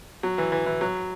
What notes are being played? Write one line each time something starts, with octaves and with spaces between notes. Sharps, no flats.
F#3
E3
E3
E3
F#3